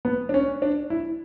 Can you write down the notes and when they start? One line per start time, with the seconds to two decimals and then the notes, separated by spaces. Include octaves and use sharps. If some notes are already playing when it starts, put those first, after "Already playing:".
0.05 B3
0.29 D4
0.34 C#4
0.62 D4
0.90 E4